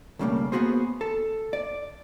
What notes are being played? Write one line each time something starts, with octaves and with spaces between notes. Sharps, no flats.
B1 F#2 C#3 G3 A3 A#3
A#3 B3 F#4 G#4 C5
A4
D5